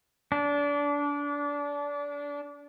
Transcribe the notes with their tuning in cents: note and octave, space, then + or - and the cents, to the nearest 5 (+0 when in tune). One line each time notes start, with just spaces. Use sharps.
D4 -25